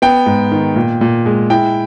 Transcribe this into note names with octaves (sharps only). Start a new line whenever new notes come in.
B3 G5
G#2
D#3
A#2
A#2
G#3
E4 G5